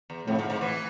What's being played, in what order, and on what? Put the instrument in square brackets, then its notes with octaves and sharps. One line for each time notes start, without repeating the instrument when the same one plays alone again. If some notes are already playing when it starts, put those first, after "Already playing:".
[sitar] E2
[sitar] F2 [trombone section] A2
[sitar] G#2
G#2
E3